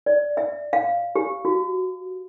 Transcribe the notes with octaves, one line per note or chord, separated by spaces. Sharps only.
D5
E5
F5
G4
F#4